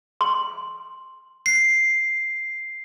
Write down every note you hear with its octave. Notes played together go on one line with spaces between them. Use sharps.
C6
C7